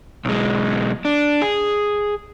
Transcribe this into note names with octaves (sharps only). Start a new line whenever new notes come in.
B1 G#3
D4
G#4